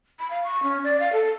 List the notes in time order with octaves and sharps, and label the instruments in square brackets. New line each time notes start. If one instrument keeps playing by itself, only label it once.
[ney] B5
F5
C#6
C#4
D5
F5
A4